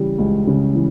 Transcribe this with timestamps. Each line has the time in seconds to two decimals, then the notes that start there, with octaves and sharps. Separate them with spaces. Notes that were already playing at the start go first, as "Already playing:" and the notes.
Already playing: C#3 E3 G3
0.18 C#2
0.47 C#3
0.74 E3